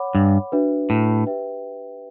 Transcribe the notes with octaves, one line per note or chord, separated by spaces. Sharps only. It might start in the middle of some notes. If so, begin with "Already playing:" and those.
Already playing: C#5 F#5 B5 D6
G2
D4 F#4 B4 E5
A2
G4 B4 E5 G5